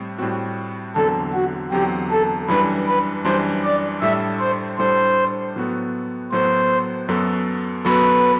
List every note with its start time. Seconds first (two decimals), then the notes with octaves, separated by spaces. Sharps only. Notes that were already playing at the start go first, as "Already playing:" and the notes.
Already playing: A2 G3 C4
0.18 A2 G3 C4 F#4
0.96 E2 D3 F#3 C4 A4
1.33 F#4
1.72 E2 D3 F#3 C4 G4
2.11 A4
2.48 F#2 E3 G3 D4 B4
2.87 B4
3.25 F#2 E3 G3 D4 C5
3.64 D5
4.01 A2 G3 D4 A4 E5
4.40 C5
4.78 A2 G3 D4 A4 C5
5.56 A2 F#3 B3 F#4 A4
6.32 A2 F#3 B3 F#4 A4 C5
7.09 F#2 F#3 B3 F#4 A4
7.85 F#2 F#3 B3 F#4 A4 B4